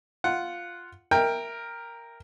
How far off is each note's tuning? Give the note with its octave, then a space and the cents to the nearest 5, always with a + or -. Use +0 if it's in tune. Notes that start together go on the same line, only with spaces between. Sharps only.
F4 +0 F#5 +0
A#4 +0 E5 +0 G5 +15